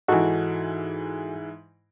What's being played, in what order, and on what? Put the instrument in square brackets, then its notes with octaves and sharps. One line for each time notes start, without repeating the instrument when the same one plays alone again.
[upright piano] G#2 E3 [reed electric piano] D#4 F#4 A4